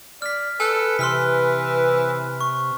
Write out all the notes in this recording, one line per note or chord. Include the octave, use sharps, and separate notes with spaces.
D5 F6 B6
A4 B4 G#5 F#6
C3 E3 C6 F6 B6
C#6